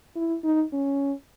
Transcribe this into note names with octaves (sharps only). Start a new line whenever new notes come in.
E4
D#4
C#4